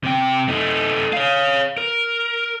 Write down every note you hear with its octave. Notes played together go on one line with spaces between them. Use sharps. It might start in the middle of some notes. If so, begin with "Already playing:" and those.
C3 G5
A3 D#4
C#5 F5
A#4